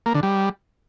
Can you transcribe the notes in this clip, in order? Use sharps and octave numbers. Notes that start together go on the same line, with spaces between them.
A#3
D3
G3